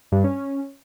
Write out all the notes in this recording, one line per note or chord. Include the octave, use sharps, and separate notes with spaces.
G2
C#4